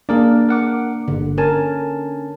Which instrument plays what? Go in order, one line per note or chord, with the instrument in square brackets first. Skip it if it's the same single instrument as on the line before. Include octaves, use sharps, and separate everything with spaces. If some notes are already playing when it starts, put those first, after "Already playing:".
[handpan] A#3 D4 [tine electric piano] G#4 A#4 D5
[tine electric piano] A#4 F#5 D6
[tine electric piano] G1 [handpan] D3
[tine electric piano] C#4 G#5 A5 [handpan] A#4